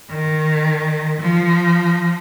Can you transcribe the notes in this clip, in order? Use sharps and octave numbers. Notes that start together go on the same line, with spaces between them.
D#3
F3